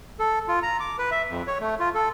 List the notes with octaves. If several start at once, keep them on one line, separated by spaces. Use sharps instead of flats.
A4
F4
A#5
D6
B4
E5
F2
C#5
A3
F4
A4